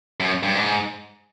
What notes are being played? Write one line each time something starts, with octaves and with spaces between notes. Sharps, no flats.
F#2
G2
G#2